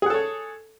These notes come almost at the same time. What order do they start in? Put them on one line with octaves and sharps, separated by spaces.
G#4 F#5 A4 C#5